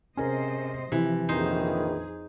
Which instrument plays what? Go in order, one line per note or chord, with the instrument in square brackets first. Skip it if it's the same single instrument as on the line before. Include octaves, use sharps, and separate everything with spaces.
[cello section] C3 C5 D#5 [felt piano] C#4 G#4 A#4
[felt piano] C3 [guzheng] E3 [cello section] F3
[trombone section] A#1 D#3 E3 [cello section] F2 G#4 [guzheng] D#4 C5